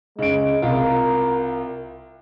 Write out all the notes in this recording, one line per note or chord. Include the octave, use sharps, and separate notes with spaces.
C#3 G#3 D7
C2 F4 A#4